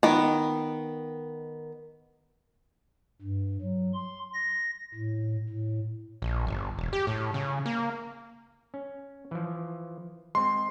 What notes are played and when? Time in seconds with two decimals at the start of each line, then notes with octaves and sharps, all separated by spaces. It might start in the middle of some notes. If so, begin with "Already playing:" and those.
0.03 D#3 B3
3.22 G2
3.61 F#3
3.94 C6
4.34 A#6
4.94 A2
5.49 A2
6.22 A#1
6.47 G1
6.78 E1
6.93 G4
7.07 A2
7.34 C#3
7.66 A#3
8.74 C#4
9.31 E3 F3
10.35 G#3 C4 C6